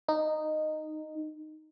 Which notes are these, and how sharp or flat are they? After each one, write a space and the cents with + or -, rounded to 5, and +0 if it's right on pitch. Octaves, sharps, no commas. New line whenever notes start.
D#4 -10